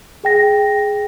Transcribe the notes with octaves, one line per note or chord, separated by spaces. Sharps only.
G#4 G5 A#6